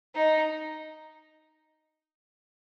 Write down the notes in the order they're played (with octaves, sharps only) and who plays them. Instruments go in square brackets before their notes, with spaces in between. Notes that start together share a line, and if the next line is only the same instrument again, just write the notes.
[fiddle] D#4